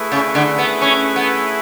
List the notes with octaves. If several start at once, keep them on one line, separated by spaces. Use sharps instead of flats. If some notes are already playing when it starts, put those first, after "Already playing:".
Already playing: A3 E4 G#4 B4
C#3
D3
B3
C#4
B3